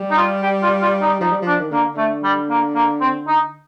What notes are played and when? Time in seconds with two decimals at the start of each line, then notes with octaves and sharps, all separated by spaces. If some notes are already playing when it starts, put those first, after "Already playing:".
Already playing: G3
0.11 D#4
0.17 F4
0.43 G4
0.63 F4
0.82 F4
1.01 D#4
1.21 F3 D#4
1.31 G3
1.42 F3 D4
1.60 D#3
1.71 D3 A#3
1.95 D3 A3
2.24 G3
2.50 A#3
2.75 A#3
3.01 C4
3.28 D#4